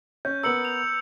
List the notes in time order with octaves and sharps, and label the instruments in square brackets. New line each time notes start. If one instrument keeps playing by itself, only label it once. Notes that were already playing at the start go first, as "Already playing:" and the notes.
[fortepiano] C#4 [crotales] G6
[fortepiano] B3 A#4 [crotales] E6 C#7 F#7
[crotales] F7